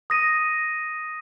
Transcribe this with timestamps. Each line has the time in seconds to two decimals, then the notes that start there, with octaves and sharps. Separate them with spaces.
0.10 D#6 A#6 D#7